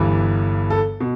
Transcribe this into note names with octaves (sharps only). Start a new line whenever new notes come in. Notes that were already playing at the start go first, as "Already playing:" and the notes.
Already playing: G1 G2 E3
A4
B2